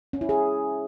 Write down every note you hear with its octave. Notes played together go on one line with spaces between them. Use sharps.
C#4
E4
G#4